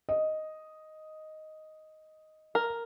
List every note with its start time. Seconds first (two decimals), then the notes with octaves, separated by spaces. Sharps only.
0.09 D#5
2.55 A#4